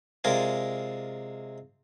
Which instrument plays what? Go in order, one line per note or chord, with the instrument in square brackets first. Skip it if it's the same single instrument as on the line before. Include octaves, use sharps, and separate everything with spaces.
[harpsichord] C3 G#3 F4 A#4 D5 G#5